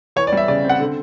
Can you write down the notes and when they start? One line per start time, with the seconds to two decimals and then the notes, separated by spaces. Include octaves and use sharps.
0.16 E3 C#5
0.27 D5
0.32 G3 E5
0.48 C#3 D5
0.65 C4 F#5
0.80 D3